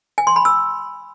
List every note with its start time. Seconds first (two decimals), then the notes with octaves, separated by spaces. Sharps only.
0.18 G#5
0.27 C6
0.36 B5
0.45 E6